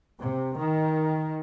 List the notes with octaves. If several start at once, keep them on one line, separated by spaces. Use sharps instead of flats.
C3
D#3